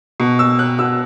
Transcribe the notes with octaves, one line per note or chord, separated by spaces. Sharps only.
B2
E6
F#6
B2 E6